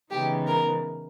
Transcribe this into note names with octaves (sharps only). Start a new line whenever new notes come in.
C#3 E3 G#3 B3 D#4 G4
A#4